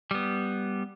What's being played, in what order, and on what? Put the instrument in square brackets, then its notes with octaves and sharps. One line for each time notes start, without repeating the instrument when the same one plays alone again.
[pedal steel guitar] G3 B3